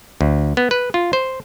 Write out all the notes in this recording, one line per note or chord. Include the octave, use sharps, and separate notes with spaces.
D2
B3
B4
F4
C5